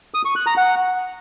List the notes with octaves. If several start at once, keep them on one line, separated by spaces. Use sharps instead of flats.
D#6
C#6
F#6
A#5
F#5